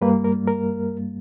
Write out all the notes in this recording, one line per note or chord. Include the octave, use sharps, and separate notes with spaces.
G2 G3 A#3 B4
A#4
A#4